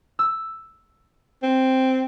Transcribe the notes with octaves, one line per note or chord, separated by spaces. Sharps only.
E6
C4